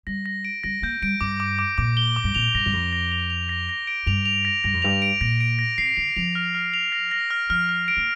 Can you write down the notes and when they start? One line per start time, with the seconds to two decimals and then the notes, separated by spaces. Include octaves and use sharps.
0.07 G3 A#6
0.26 A#6
0.45 D7
0.63 G3 A#6
0.82 A#3 G6
1.02 G3 D7
1.21 G2 D6
1.40 D6
1.59 D6
1.78 A#2 D6
1.97 G7
2.16 D6
2.24 G2
2.35 A#2 F7
2.54 G2 A#6
2.66 G2
2.73 F2 A#6
2.93 A#6
3.12 F7
3.30 F7
3.49 A#6
3.69 A#6
3.87 D7
4.07 G2 F7
4.25 F7
4.45 A#6
4.64 G2 A#6
4.74 F2
4.82 G2 F7
5.02 D7
5.21 A#2 A#6
5.40 D7
5.59 A#6
5.78 C3 C7
5.97 D3 F7
6.16 F3 F7
6.35 F6
6.55 F6
6.74 F7
6.92 A#6
7.11 A#6
7.30 F6
7.50 F3 F6
7.69 F6
7.88 D7
7.97 A#3